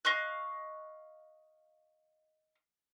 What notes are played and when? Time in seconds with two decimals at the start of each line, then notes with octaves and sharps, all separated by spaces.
0.05 D#5 F5 C#6 F#6